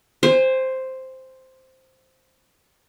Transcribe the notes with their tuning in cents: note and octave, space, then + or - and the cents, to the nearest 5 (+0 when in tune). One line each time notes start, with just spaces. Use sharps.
C5 +0 G#5 -40